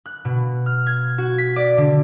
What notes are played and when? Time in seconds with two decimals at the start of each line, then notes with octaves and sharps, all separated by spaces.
0.06 F#6
0.25 B2
0.66 F6
0.86 G#6
1.18 F#4
1.38 B6
1.56 D5
1.78 D3